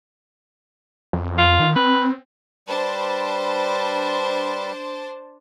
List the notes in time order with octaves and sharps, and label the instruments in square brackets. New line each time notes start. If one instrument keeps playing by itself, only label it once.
[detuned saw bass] F2
[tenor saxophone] F4
[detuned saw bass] D#3
[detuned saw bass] C4 [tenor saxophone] B4
[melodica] G3 B4 [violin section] D4 C5 A5